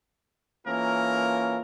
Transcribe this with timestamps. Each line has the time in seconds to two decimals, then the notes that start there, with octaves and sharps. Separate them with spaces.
0.66 E3 A#3 C#4 F4 A4 A#4